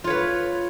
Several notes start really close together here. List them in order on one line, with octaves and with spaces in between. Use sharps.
F4 C#5 B4